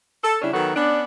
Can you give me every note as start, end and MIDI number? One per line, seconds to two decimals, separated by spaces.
0.24 0.38 69
0.42 0.53 49
0.42 0.53 55
0.42 0.53 61
0.42 0.53 62
0.42 0.53 64
0.53 0.75 51
0.53 0.75 54
0.53 0.75 59
0.53 0.75 66
0.53 0.75 69
0.76 1.03 59
0.76 1.03 61
0.76 1.03 62